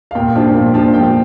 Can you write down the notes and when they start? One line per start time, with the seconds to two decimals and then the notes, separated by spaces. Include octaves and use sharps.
0.11 F5
0.15 A#2 G5
0.35 F3 D4 F4
0.54 A#2
0.74 F3 D4 F4
0.93 A#2 G5